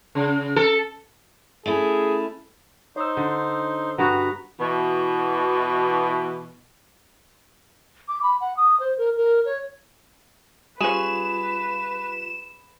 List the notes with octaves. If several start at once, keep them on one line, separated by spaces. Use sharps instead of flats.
C#3
A4
A3 C#4 E4 G#4
D#4 C5 C#5 E6
D3
G2 B3 F#4 B4 F#5 A#5
B2 E3
D6
B5
F#5
D#6
C5
A#4
A#4
C#5
G3 C#4 F4 G#4 B4 E7